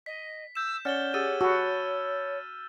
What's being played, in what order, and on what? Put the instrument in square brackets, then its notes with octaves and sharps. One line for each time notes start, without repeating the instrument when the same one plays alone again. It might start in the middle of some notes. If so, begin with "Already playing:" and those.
[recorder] D#5 [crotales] B6
[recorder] E6 [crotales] G6 E7
[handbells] C#4 D5 F#5 [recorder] C#5 [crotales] F6 A6 G7
[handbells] G4 G#4 F#5 [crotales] E6 A6 D#7
[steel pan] F#4 [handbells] A5 B5 [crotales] E6